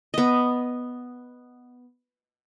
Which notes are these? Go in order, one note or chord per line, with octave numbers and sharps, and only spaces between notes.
B3 D#5